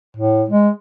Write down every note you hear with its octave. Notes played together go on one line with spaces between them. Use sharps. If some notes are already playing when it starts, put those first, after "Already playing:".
A2
G#3